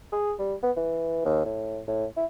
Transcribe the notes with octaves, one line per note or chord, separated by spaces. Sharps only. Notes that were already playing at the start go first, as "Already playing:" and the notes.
G#4
G3
B3
E3
D#2
A2
A2
E4